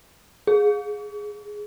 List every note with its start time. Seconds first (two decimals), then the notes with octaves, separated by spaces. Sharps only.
0.47 G#4